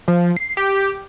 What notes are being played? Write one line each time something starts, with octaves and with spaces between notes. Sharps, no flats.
F3
C7
G4